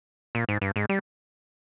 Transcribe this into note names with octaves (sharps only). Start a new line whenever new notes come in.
A#2
G#2
G2
G#2
G3